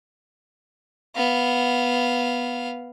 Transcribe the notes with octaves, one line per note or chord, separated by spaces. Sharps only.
B3 F5